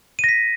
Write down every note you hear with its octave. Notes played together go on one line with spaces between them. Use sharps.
A#6 B6 D#7